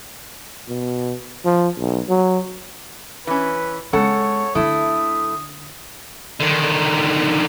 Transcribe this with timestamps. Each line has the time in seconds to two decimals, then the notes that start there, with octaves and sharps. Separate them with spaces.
0.68 B2
1.45 F3
1.78 B1
2.09 F#3
3.27 E3 C#4 B4
3.93 C#3 G#3 B3 A4 C#5 F#5
4.55 D3 A3 D4 E4 D#6
6.40 D3 D#3